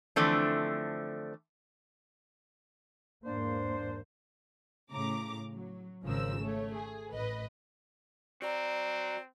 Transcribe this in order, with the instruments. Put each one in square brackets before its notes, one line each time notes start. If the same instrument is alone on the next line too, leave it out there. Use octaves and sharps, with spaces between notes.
[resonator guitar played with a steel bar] D3 E3 F3 A3 C4 D4
[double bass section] E2 G#2 A#3 [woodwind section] D4 C5
[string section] A2 C#3 A#5 D6
F#3
G#1 C#3 F3 A#4 E6
A3 C#5
G#4
A1 B4 D#5
[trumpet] C4 [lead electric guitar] F#4 A#5 [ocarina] D5